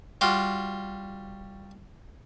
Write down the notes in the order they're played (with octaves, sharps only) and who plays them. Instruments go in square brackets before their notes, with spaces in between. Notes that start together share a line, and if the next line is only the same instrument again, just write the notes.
[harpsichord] G3 F4 F#4